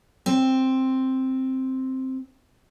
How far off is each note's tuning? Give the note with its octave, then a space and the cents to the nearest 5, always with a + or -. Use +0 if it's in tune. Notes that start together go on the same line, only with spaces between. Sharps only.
C4 +5